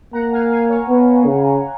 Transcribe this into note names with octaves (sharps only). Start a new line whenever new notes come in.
A#3 F#5 A#5
F5 G#5
F5 G#5
C#5 F5
B3
C#3